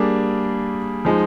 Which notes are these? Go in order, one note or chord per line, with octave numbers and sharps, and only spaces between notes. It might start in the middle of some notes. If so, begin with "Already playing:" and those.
Already playing: G3 A#3 D4 G#4
F3 G#3 D#4